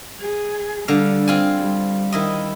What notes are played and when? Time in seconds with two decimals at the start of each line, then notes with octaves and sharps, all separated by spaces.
0.20 G#4
0.88 D3 G3 F5
1.28 C4 F4 G#5
1.57 G3
2.12 D#3 E4 D#5